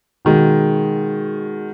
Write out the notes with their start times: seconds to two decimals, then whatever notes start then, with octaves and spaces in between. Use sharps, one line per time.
0.25 B2 D#3 G#3